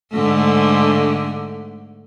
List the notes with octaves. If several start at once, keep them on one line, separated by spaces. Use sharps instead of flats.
G#2 D3 A3